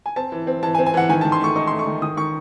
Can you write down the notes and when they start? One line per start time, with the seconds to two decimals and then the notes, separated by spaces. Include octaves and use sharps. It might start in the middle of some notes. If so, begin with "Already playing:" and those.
0.06 G#5
0.16 C4 A5
0.32 E3
0.47 C4
0.63 E3 A5
0.75 G#5
0.79 C4
0.86 G#5
0.94 E3 F#5
1.09 D#3 G#5
1.21 D#3 A5
1.32 C6
1.41 A3 C#6
1.56 D#4 C#6
1.67 A3 C6
1.79 C#6
1.87 D#3
2.02 D#3 D#6
2.17 D#3 C#6